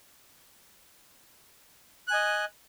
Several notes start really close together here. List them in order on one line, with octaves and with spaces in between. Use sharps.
F#6 G#5 D#5